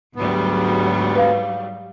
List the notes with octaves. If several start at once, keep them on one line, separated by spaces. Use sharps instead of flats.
D2 G#2 F#3 G3 B3
B4 F5